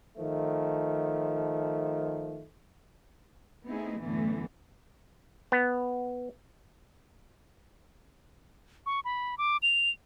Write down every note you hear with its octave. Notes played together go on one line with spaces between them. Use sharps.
D#3 F3 A3
A3 B3 C4 D#4 E4 G#4
F#2 A2 D3 E3 A3 B3
B3
C#6
B5
D6
F7